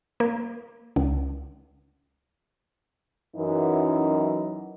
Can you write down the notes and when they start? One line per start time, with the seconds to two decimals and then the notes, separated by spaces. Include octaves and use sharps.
0.20 A#3
0.96 C#2
3.36 F#2 E3 D#4